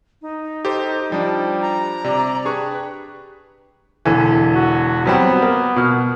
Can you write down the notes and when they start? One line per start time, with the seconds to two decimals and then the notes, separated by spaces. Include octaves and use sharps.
0.22 D#4
0.65 G4 A4 C5
1.12 F3 G3 D4
1.62 A#5
2.04 C3 D5
2.45 D4 G4 G#4 B4 C#6
4.05 E1 D3 E3
4.55 F#4
5.06 F#3 G3 B3 C4
5.42 A#3
5.76 B2 F6